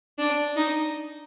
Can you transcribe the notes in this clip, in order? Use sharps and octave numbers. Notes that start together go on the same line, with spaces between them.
D4
D#4